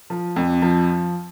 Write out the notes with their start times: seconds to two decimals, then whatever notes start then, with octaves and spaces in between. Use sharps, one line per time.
0.10 F3
0.36 F2
0.62 F3